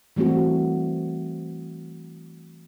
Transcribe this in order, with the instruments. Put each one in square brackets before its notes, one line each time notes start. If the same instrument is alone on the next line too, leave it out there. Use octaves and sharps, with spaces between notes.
[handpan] E3 G3 A3 C4 F#4